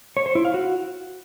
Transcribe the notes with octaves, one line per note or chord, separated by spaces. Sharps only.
C#5
C5
E4
F5
F#4